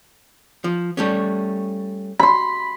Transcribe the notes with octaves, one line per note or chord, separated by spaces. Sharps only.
F3
G3 A3 C#4
B5 C6